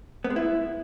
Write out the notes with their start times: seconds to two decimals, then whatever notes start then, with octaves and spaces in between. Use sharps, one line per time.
0.24 B3
0.30 G#3
0.36 E4